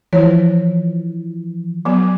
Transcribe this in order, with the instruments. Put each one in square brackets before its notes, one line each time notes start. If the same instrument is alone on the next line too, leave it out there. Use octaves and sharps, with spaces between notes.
[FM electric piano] E3 F3 [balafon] C5 C#5
[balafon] F#3 B3